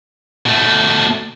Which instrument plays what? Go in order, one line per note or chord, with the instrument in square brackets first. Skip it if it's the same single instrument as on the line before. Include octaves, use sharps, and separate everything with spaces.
[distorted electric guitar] B2 A3